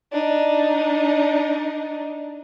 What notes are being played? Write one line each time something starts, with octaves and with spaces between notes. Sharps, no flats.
D4 D#4